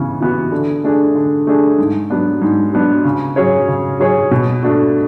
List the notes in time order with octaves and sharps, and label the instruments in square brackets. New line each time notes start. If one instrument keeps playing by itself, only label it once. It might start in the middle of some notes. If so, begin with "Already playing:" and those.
Already playing: [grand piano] C#3 E3 B3
E3 B3 F#4
D3
A3 D4 G#4
D3
A3 D4 G#4
G#2
F#3 B3 D4
G#2
F#3 B3 D4
C#3
F#3 C#4 G#4 C#5
C#3
F#3 C#4 G#4 C#5
B2
A3 D4 F#4